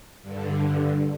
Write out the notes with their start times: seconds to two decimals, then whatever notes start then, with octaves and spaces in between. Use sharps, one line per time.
0.22 G2 D3